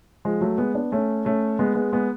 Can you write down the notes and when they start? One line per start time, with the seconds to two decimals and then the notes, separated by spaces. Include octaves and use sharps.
0.25 F3 G#3
0.41 F#3 A3
0.58 G#3 B3
0.74 B3 D4
0.92 A3 C#4
1.25 A3 C#4
1.59 G#3 B3
1.75 G#3 B3
1.93 G#3 B3